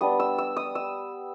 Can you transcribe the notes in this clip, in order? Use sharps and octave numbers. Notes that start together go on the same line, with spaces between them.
G3 B3 D4 D#6
E6
E6
D#6
E6